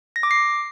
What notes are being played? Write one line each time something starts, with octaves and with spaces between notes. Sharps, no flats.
A#6
D6
C7